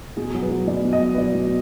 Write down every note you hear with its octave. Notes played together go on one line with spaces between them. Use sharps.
B2 G#4
F#3
B4
F#3
B2 D5
B2
D#5
F#3
B4
F#3 D5
B2